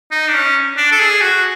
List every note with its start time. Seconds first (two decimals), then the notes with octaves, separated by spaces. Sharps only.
0.11 D#4
0.28 D4
0.34 C#4
0.77 D4
0.92 A4
1.00 G#4
1.21 F#4